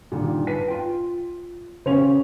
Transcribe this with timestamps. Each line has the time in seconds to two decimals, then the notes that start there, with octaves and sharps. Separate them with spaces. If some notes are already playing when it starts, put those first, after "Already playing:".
0.12 G2 A#2 D3 D#3
0.47 B4 G#5 A5 B6
0.68 F4 G5
1.86 C#3 C#4 G4 C5 F7